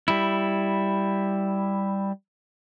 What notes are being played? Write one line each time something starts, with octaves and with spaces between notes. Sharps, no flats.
G3 E4